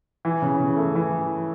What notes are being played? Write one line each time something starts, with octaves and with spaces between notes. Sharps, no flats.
E3
C#3
C#3
A3
E3